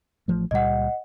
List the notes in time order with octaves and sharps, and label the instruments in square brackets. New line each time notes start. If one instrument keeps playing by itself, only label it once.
[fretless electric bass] A1 F3 A3
[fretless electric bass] C#2 A#2 G3 [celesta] D#5 F#5